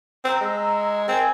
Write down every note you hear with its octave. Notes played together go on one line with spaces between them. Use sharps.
C4 A#5 E6
G#3
C4 A#4 G#5